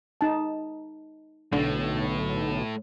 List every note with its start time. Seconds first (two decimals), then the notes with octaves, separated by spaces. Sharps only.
0.21 D#4 A5
1.53 B1 A2 D3